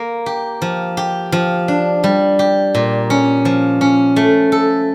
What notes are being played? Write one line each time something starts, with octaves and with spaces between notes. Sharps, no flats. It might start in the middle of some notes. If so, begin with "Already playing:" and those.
Already playing: A#3
G4
F3
G4
F3
D4
G3
G4
A#2
C#4
F3
C#4
A3
A4